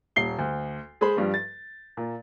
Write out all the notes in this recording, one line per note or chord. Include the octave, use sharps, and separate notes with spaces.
D#1 C7 G7
D2
G#3 G#4 C5 B5
G2 F3 G3
A6
A#2